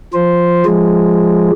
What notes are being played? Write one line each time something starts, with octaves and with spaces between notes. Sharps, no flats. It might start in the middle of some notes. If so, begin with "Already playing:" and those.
F3 C5
F3 G#3